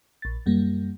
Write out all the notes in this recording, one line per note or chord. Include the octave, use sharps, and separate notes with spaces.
A#1 A6
F#2 G3 A#3